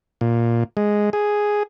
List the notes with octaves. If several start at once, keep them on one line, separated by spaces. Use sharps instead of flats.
A#2
G#3
G#4